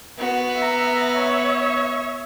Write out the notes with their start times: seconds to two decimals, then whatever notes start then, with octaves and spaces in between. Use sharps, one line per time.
0.18 B3 F#4
0.57 E5 A#5
1.17 C#5 E5